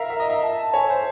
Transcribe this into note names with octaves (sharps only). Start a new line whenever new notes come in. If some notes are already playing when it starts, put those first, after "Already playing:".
Already playing: A#4 E5 F5 A#5
E5
D#5
E5
A5
C#5 G#5
C5